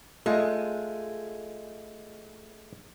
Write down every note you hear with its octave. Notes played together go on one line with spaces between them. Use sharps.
G#3 A3 F4